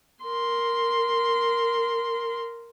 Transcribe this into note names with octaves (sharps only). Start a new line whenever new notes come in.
A#4 C6